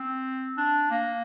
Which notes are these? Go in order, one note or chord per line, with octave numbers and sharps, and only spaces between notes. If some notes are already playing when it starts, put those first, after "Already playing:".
Already playing: C4
D4
A#3